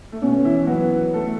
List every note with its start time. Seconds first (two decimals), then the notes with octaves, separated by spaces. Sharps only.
0.12 A3
0.22 B2 B3 C#4
0.44 E3 E4
0.67 F#3 B3 F#4
1.14 A3 A4